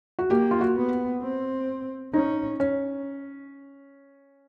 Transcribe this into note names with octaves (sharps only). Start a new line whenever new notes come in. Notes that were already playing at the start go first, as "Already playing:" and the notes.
F#4
A#3 G4
F4
F#4
B3
C4
C#4 D#4
C#4